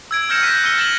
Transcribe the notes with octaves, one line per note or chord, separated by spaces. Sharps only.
E6 G#6 D7
E6 F6 G6 A#6 C#7 E7
F#6 G6 A#6 B6 D#7
E6 C#7 D#7 G7
A6 E7 F#7